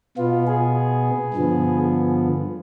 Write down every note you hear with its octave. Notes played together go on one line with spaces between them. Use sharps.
B2 B3 F4
G#4
G2 D3 F3 B3